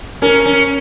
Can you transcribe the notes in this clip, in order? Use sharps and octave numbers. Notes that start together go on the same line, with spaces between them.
C#4 A#4
C#4